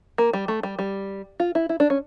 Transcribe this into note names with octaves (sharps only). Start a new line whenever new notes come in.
A#3
G3
A3
G3
G3
F4
E4
E4
D4
C#4